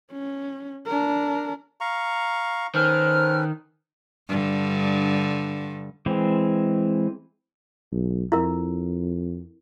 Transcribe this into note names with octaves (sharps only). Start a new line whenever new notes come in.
C#4
D4 A#4
F5 A#5 C#6
D#3 C#4 A4 B4 C5 F6
G2 D3
E3 G#3 C4
B1
F2 E4 A#4